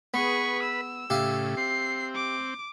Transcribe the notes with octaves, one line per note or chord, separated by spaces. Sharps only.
B3 G#4 B4 B5 C#6
E6
A2 C#3 G4 E5 F5
C4 C7
D6